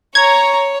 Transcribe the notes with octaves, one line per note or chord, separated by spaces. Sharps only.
C#5 A#5 G#6